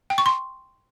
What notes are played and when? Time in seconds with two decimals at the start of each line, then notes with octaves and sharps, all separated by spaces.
0.10 G5
0.18 C#6
0.26 C6